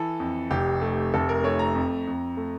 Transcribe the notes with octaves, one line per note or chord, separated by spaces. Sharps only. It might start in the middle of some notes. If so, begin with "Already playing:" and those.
Already playing: E3 A4
F2
F1 G4
A3
F1 A4
A#4
A3 C#5
A#5
F2
F2
A3